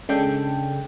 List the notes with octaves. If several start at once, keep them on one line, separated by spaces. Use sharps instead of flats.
C#3 G#3 D4 A4 G5